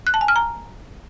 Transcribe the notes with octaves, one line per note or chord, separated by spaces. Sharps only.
F#6
A5
G#5
F6
A#5